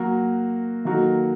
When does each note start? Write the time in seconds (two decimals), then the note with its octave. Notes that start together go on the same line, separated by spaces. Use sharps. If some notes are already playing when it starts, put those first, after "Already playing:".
Already playing: F#3 A#3 F#4
0.85 D#3 F#3 A#3 F#4 A4